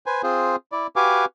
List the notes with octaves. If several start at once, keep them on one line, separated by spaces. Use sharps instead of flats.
B4 C5 G#5
C4 F4 G#4 C5
E4 D5
F#4 G4 B4 F5 G#5 D6